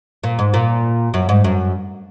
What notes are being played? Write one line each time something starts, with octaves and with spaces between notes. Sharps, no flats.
A#2
G#2
A#2
F#2
G#2
F#2